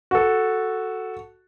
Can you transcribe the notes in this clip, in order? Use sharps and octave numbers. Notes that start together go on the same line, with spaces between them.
F#4 A4